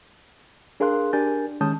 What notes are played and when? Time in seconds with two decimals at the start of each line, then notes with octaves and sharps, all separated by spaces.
0.80 D4 G#4 A#4 F5 C6 F#6
1.13 D4 G4 A#4 G#5 G6 A6
1.61 D#3 G#3 C#4 A5 D#6 G6